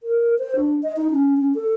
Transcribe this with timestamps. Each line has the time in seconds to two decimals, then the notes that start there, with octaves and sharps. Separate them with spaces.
0.03 A#4
0.38 C5
0.56 D4
0.83 D#5
0.96 D#4
1.10 C#4
1.37 C#4
1.55 A4